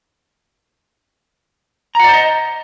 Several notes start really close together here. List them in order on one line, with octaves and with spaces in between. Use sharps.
A#5 F#5 D5 C5 D#5